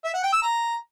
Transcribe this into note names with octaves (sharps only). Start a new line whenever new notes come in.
E5
F#5
G5
E6
A#5